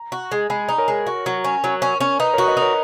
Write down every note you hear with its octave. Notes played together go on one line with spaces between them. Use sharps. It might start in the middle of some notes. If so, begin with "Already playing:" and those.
Already playing: A#5
F#4
G#3
G#3 G#5 B5
D#4
A#4 C#5
G#3
F#4
F#3
C#4
F#3
C#4
C#4
D#4 B4 D#5
F#4 A#4 C#5
B4 D#5
D#4
A#4 C#5